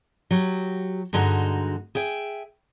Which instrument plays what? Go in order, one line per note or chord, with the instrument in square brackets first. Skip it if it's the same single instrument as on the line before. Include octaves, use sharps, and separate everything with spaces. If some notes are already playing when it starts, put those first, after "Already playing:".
[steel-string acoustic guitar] F#3 G4
G2 D3 G#3 D#4 F#4 A#5
G#4 E5 G5